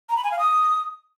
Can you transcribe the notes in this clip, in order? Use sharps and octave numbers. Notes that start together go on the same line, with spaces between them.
A#5
B5
G#5
F5
D#6